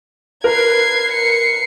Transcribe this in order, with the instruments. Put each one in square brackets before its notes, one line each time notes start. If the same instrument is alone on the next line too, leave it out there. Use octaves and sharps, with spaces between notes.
[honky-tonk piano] A#4 B4 [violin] G#6 C7
[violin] C7 C#7